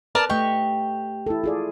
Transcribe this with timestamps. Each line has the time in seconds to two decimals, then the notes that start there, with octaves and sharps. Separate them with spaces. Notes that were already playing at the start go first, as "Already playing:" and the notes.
0.15 A#4 B4 D5 A5
0.30 A3 G4 D#5 C#6
1.26 E4 A4
1.44 F4 G#4 D5